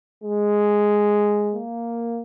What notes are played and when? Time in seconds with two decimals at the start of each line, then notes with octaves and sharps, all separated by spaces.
0.23 G#3
1.55 A#3